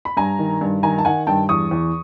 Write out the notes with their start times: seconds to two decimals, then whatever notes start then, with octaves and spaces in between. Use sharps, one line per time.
0.05 B5
0.17 G2 G#5 A#5
0.39 D#3
0.61 G2
0.83 D#3 G#5 A#5
0.98 A5
1.05 D#3 F#5 G#5
1.27 G2 G5 A5
1.49 E2 C#6 D#6
1.71 E2